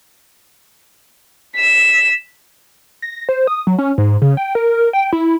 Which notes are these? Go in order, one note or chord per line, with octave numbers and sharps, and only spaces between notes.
B6 E7
A#6
C5
D#6
F#3
C#4
G#2
C#3
G5
A#4
G5
E4